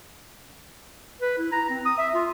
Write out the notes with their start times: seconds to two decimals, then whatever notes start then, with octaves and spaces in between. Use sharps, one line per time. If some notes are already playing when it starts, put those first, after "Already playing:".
1.21 B4
1.38 E4
1.52 A#5
1.69 C4
1.86 D#6
1.98 E5
2.14 F4